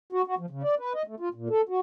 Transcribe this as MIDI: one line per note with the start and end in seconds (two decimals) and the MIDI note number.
0.12 0.22 66
0.27 0.35 66
0.39 0.46 53
0.50 0.63 49
0.63 0.75 74
0.79 0.93 71
0.94 1.03 75
1.07 1.15 57
1.20 1.29 65
1.34 1.49 46
1.50 1.62 69
1.69 1.80 66